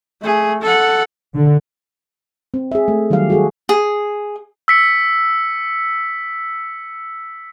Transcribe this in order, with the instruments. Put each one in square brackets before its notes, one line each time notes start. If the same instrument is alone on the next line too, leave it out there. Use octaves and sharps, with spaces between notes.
[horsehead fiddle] A3 G#4
A4 F#5
[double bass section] D3
[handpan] C4
G#4 E5
A3
D#3 F#3 G3 G4 F5
F#4 G#4 A4
[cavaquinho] G#4
[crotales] E6 B6 C#7